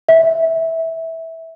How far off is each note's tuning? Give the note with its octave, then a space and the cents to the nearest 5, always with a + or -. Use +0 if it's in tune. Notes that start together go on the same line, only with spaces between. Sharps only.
E5 -15